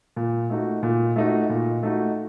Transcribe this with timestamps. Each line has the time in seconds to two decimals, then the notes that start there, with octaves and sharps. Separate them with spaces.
0.16 A#2
0.50 A3 D#4 F#4
0.83 A#2
1.16 A3 D#4 F#4
1.49 A#2
1.83 A3 D#4 F#4